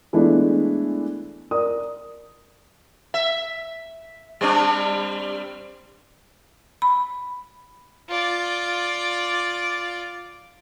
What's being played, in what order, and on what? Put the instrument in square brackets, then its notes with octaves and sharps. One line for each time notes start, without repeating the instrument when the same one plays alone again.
[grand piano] E3 G#3 A3 B3 D4 E4
A#4 D5 D#6
[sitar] E5
G3 C4 D4
[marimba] B5
[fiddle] F4 D5